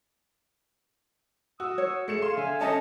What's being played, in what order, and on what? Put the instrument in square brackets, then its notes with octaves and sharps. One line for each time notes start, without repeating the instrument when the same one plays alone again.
[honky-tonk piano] F#4 [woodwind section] D#6 E6
[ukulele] C#5
[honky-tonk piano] A3 C#7 E7 [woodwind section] G#4
[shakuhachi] F5 [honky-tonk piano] C6
[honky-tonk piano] D3 [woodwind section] E5 G#5
[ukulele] C#4 A4 A5 [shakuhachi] D#5